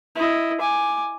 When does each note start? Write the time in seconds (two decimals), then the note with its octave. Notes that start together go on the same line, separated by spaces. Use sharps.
0.16 E4 D#5
0.60 G#5 D6